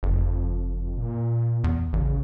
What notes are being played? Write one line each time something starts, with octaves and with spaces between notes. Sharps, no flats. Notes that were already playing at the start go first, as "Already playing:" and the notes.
F#1 F2
A#2
E2
A1 C#3